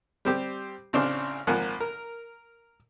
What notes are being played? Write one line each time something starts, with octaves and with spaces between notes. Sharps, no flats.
G3 C4 G4
A1 C#3 C4 D4 C6
G#1 F3 A#3 F#5 G#5
A#4